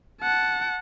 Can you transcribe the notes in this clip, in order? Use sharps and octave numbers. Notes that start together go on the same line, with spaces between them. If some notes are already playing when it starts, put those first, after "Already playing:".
F#5 A5